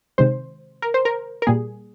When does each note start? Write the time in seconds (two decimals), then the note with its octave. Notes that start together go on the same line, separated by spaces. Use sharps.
0.18 C3 D#3 G#3 C5
0.82 A#4
0.94 C5
1.05 A#4
1.42 A#4
1.47 A#2 G3 A#3 G#4